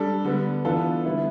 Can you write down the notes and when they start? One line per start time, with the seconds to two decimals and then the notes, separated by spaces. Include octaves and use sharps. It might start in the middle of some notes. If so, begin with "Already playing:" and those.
Already playing: G3 D4 A4
0.24 D3 G3 B3
0.65 E3 B3 D4 F4 A4
1.05 D3 G3 B3 E4